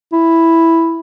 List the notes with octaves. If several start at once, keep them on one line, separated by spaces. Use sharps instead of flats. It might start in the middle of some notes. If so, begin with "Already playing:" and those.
E4